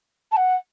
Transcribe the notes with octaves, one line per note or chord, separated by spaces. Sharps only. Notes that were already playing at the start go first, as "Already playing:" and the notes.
A5
F#5